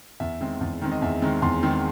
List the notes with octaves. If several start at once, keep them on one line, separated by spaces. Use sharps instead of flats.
E2 E5
D#3 G#3 C4
E2
D#3 G#3 C4
D#5
E2 E5
D#3 G#3 C4
E2 C6
D#3 G#3 C4